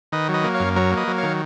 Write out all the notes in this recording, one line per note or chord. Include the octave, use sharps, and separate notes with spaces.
D#3 B4 D#5
F#3
B4 D#5
A#3
C#5 F5
F#2
F#3 A#4 C#5
A#3
B4 D#5
F#3
C#5 F5
D#3